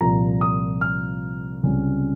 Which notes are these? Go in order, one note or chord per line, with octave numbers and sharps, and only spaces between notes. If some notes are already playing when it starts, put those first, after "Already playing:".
C2 A#2 F3 A#5
D#6
F6
C#2 C3 G3 C#4